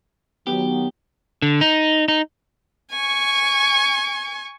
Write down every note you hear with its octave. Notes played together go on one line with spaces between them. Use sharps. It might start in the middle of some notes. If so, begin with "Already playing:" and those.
D#3 F#3 B3 G4
D3
D#4
D#4
G#5 C#6